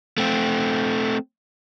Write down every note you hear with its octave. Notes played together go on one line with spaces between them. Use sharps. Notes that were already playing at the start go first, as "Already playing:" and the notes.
A3 C4